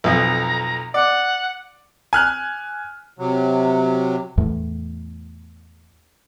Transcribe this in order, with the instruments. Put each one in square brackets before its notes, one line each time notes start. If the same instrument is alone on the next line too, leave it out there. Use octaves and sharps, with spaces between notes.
[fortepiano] B1 F2 [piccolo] A#5
[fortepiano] D5 [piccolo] F#5
[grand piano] G#5 F6 F#6
[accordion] C3 F#3
[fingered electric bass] E2 A2